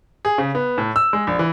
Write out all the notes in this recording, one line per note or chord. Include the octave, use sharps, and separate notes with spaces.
G#4
C#3
B3
A2
E6
G#3
A#1
E3